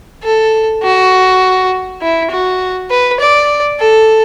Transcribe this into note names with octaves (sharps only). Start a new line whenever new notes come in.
A4
F#4
E4
F#4
B4
D5
A4